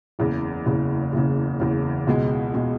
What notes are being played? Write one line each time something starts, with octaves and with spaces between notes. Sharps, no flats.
F#1 E2 C#3
F#1 E2 C#3
F#1 E2 C#3
F#1 E2 C#3
C#2 B2 G#3
B2 G#3